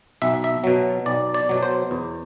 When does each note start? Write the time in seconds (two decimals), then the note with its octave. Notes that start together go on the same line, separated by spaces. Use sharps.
0.22 B1 E5
0.44 E5
0.64 B2 F#3
1.06 B1 D5
1.34 D5
1.49 B2 F#3
1.63 C5
1.91 E2